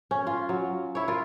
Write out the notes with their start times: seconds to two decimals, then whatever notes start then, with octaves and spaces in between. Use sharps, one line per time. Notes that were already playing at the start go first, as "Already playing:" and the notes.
0.11 C#4
0.27 F4
0.49 F#3
0.95 E4 C#5
1.08 F4 A#4